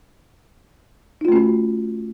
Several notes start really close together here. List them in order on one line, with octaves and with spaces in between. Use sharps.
D#4 F4 A3 C#4 F#4